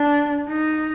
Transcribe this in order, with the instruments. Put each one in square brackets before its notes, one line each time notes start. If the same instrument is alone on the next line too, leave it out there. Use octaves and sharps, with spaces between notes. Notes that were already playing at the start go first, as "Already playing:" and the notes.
Already playing: [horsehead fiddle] D4
D#4